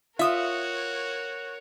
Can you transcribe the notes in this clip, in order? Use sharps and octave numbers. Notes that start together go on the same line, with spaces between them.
F4 F#4 A#4 C#5 E5 D#6